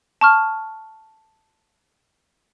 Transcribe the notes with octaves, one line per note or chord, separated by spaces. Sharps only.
A5 C#6 F6